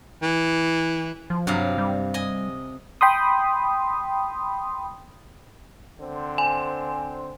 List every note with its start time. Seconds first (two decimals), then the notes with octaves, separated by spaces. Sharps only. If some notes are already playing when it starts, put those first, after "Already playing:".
0.22 E3
1.30 F3
1.47 G2 C3 F#3 F5
1.78 G3
2.14 D#5 G#5
3.01 G5 B5 C6 D#6
5.99 D3 C4 C5
6.38 G#5